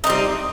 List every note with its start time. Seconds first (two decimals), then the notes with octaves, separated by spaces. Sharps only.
0.04 D#4
0.07 C4
0.10 G3